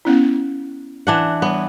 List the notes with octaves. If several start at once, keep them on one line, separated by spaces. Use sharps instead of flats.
B3 C#4 E4
E3 D4 F#5
G3 B3